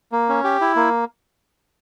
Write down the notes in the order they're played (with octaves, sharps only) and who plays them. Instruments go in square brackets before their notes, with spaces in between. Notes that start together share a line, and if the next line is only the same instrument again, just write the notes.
[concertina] A#3
C#4
G4
E4
A#3